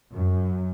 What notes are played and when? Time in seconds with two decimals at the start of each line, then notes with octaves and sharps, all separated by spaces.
0.13 F#2